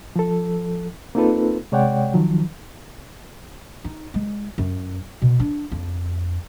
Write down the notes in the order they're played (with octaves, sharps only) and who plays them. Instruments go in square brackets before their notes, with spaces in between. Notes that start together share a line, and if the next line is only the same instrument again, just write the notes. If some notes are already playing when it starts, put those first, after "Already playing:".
[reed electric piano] F3 A4
A#3 C4 D#4 F4 A4 B4
C3 G#3 C#5 D5 F#5 G5
D#3 F3 F#3
[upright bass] D#4
G#3
F#2
B2
D4
F2